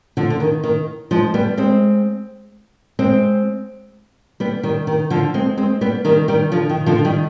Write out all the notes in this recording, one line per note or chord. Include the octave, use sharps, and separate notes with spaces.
D3 F3
D3
D#3
D#3
F3 G#3
G3 B3
G#3 C4
G#3 C4
G3 B3
D#3 G3
D#3
D3 F3
G#3 C4
G#3 C4
G3 B3
D#3 G3
D#3 G3
D3 F3
D#3
D3 F3
D#3 G3